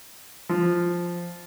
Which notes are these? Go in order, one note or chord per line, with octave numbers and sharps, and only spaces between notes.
F3